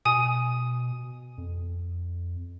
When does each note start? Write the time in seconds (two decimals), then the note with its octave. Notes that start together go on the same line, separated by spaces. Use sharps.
0.05 B2 G#5 D#6
1.38 F2